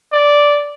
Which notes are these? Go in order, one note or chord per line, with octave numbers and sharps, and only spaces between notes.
D5